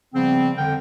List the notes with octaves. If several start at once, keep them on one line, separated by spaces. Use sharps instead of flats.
C#3 F3 G3 B3 C4
F2 D3 A#4 G5